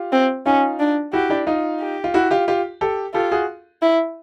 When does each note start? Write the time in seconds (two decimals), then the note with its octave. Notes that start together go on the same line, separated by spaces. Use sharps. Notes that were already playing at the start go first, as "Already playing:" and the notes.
Already playing: F4 G4
0.12 C4
0.46 C#4 D#4 F4
0.80 D4
1.13 E4 F#4 G4
1.30 D4 E4
1.47 D#4 F4
1.80 G4
2.04 F4
2.14 E4 F#4
2.31 F4 G4
2.48 F4 G4
2.81 G4 A4
3.14 F4 G4 A4
3.31 F#4 G#4
3.82 E4